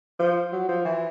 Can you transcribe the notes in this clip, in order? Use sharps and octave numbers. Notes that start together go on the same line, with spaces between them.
F3
F#3
F3
E3